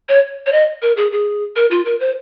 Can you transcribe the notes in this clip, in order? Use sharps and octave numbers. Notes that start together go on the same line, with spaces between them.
C#5
C#5
D#5
A#4
G#4
G#4
A#4
F4
A#4
C5